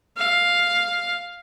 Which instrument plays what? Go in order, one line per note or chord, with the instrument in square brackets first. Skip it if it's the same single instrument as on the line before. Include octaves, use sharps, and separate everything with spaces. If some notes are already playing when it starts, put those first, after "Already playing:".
[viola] F5